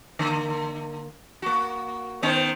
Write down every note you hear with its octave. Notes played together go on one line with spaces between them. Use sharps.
D3 A#3
A#3 F#4
D#3 B3 C5